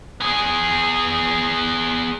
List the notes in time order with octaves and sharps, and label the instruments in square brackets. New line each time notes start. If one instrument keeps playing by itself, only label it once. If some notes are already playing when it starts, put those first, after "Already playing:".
[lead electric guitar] B3 G#4